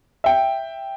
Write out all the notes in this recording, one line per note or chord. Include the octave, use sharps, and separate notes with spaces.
E5 G5